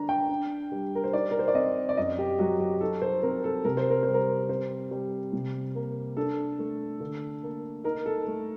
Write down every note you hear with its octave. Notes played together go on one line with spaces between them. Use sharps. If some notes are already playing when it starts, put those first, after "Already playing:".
Already playing: D3 D4 A#5
G5
D4
G3
A#4
C5
D#4 D5
A#4
C5
D5
C4 D#5
D5
F#2 D#5
G4
F#3 F#4
G4
D#4 A4
C5
C4 A#4
A4
C3 A#4
C5
A#4
G3 C5
A#4
C4 C5
G3
C3
A#3
D4 A4
A3
D3
A#3
D#4 A#4
A4
A3